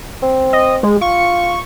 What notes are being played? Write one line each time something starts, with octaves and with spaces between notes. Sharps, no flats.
C4
D#5
G#3
F4 C#6